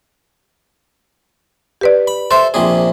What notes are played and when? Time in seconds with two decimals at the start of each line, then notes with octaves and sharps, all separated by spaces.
1.81 G4 B4 D5
2.07 B5
2.31 A4 C5 E5 C6
2.54 A#1 C3 G#4